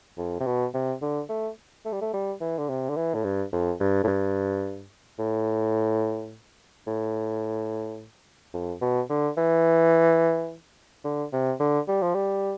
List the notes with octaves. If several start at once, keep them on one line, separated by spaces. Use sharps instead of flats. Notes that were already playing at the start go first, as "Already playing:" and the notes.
F2
C3
B2
C3
D3
A3
A3
G3
A3
G3
E3
D3
C3
D3
E3
A2
G2
F2
G2
A2
G2
A2
A2
F2
B2
D3
E3
D3
C3
D3
G3
F3
G3